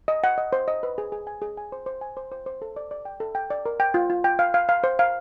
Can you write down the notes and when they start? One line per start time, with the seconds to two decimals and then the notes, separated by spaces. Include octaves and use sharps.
0.08 D#5
0.24 F#5
0.38 D#5
0.53 C5
0.68 D#5
0.83 B4
0.98 G#4
1.12 G#4
1.27 G#5
1.42 G#4
1.57 G#5
1.72 C5
1.86 C5
2.01 G#5
2.17 C5
2.32 C5
2.46 C5
2.62 A4
2.76 D5
2.91 D5
3.05 G5
3.20 A4
3.35 G5
3.50 D5
3.66 A#4
3.80 G5
3.94 F4
4.10 F4
4.24 G5
4.39 F5
4.54 F5
4.69 F5
4.84 C5
4.99 F5